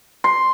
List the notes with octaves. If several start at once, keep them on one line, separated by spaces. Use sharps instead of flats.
C6